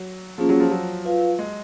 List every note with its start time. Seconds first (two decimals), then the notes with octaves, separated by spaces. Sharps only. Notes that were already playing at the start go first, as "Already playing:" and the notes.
Already playing: F#3
0.38 F3 A#3 C#4 F4 G#4
0.49 F#3
0.60 F3
0.71 F#3
1.05 F4 B4 F5
1.39 G#3